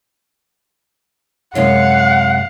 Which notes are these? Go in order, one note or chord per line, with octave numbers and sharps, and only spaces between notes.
F#2 C3 G#3 F5 F#5